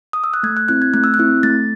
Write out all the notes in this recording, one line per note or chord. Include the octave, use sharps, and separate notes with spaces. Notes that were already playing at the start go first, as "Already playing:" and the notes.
D#6
E6
F#6
A3 G#6
F#6
C4 E4 F#6
G#6
A3 F#6
E6
F#6
C4 E4
A3 A6